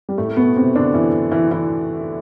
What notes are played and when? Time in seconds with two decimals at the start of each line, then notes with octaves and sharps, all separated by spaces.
0.09 G3
0.18 A2 A3
0.29 A3
0.37 B2 B3
0.56 C3 C4
0.75 D3 D4
0.94 E3 E4
1.32 E3 E4
1.51 E3 E4